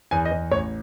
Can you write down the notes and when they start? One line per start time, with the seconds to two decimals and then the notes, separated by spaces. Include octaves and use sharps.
0.11 E2 G#5
0.25 D#5
0.31 E2
0.51 A1 C#5